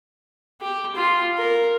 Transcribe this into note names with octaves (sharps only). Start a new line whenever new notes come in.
G4
F4 C6
A#4